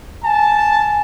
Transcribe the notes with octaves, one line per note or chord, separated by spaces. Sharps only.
G#5 A5